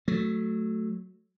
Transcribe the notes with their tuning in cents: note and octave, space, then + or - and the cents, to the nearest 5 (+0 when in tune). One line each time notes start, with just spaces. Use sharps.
F#3 +0 A3 +0